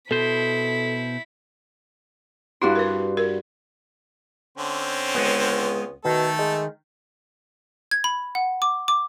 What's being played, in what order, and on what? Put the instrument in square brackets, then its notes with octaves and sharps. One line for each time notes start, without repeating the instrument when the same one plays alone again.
[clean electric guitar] B2 C5 [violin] E4 B6 [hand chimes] A4
[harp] G2 F#4 C6 [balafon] E4
[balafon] A#4 B4
A#4
[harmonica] D3 C4 C#4
[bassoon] C#2 [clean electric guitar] G#3 B3
[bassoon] B2 [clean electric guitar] D#3 [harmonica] A3 A4
[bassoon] G#3
[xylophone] G#6
B5
F#5
D6
D6